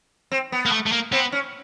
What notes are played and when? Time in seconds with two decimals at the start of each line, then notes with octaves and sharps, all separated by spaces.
0.32 C4
0.52 B3
0.66 A#3
0.72 A3
0.86 A3
0.92 A#3
1.12 B3 C4
1.32 C#4